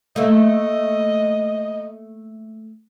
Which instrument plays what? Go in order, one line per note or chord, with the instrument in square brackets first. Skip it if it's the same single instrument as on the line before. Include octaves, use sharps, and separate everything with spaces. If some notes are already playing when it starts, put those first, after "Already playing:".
[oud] A3 A#3 [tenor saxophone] D#5